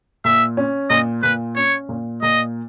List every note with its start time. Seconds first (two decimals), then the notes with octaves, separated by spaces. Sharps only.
0.25 A#2 E5
0.57 C#4
0.90 A#2 D#5
1.22 A#2 B4
1.56 C#4 C#5
1.89 A#2
2.22 A#2 D#5